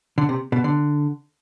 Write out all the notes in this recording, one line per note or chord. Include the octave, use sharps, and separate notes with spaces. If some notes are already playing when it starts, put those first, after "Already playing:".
D3
C3
B2
D3